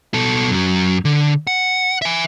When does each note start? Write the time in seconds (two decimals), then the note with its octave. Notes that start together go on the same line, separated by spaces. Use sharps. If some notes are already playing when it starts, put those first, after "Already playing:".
0.14 B2 A4
0.50 F#2 F#3
1.05 D3
1.47 F#5
2.02 E5 G#5